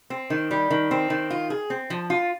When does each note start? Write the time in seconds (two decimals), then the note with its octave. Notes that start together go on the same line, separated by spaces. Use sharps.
0.10 C4
0.30 D#3
0.51 G3
0.70 D#3
0.91 C4
1.10 D#3
1.30 F4
1.50 G#4
1.70 C4
1.90 F3
2.10 F4